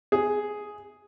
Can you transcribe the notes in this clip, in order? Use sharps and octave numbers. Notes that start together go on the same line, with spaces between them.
G#4